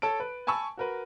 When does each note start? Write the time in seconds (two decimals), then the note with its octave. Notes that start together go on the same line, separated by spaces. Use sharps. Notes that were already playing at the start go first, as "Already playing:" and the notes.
0.02 A4 C#5 A5 D7
0.20 B4
0.47 G#5 A5 B5 C#6 E6
0.77 F#4 A#4 B4